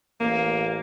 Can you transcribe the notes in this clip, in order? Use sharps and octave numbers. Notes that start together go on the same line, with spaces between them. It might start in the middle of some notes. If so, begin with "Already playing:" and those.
A1 A#3